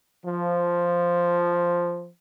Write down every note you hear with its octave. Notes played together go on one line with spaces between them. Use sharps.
F3